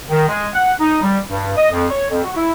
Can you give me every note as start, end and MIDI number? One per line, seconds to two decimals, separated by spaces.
0.10 0.25 51
0.28 0.46 56
0.53 0.73 78
0.79 1.00 63
1.02 1.18 55
1.28 1.52 43
1.56 1.67 75
1.72 1.86 41
1.90 2.10 73
2.10 2.22 41
2.23 2.32 66
2.36 2.51 64